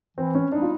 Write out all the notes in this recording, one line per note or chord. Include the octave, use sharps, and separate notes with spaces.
E3 C4
C#4
G3 B3 D4 D#4
F4